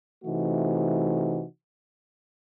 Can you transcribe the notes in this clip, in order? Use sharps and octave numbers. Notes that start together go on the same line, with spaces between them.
C3 E3 A3 D#4 F#4